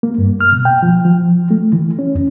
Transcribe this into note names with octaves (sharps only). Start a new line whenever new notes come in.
A#3
G2
F6
B2
G5
F3
F3
A3
E3
C#4
E2